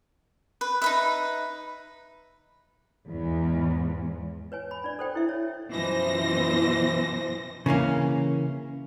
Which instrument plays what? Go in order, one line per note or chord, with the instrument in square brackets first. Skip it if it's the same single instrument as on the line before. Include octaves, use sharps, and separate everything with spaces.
[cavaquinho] B4
D#4 B4 E5
[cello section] E2 G#2
[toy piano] B4 C#5 G#5
B5
D4 D5
A4 C5 G5
E4 E5
C#5
[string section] F#2 B2 E3 F3 C5 A#6
[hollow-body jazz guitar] C#3 E3 A#3 C#4